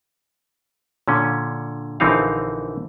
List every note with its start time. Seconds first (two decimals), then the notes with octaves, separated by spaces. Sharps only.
1.08 A#2 D3 C#4
2.00 A#1 D3 E3 C4 D#4 F5